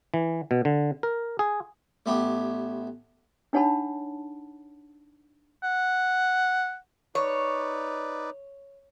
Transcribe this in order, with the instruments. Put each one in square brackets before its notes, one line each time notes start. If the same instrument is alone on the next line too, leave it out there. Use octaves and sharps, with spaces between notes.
[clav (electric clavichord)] E3
B2
D3
A#4
G#4
[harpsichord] A1 A3 B3 G4
[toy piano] D4 D#4 C#5 F#5 A5 B5
[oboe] F#5
[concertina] D#4 B4 D5 [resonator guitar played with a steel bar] C#5